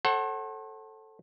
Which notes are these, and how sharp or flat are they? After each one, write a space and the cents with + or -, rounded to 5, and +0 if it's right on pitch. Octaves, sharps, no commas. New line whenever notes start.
A4 +0 C5 +45 F#5 +20